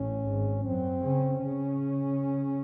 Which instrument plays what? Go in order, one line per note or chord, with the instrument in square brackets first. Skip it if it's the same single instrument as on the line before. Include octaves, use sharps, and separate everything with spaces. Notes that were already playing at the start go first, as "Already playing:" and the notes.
Already playing: [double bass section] A1 A2 [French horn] C#4
[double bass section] G#1 G#2
[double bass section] F#2 F#3 [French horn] C4
[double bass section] C#3 C#4
C#3 C#4